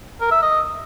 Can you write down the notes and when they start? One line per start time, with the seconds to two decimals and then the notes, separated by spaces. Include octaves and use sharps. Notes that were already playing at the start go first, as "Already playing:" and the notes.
0.21 A#4
0.31 E5
0.42 D#5